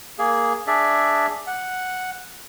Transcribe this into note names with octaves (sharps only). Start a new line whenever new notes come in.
A#3 G#4
D4 G#4 D5 E5
F#5